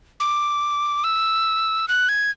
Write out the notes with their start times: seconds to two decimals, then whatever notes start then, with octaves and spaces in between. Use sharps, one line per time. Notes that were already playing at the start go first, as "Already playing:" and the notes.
0.20 D6
1.04 E6
1.88 F#6
2.09 G#6